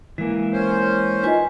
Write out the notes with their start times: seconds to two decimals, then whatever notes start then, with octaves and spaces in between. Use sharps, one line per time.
0.18 E3 G#3 A#3
0.53 C#4 C5
1.23 D#4 F4 B4 D#5 G#5